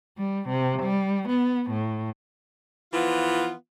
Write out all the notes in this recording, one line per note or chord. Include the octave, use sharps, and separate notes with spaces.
G3
C3
G3
B3
A2
E3 F3 B3 F4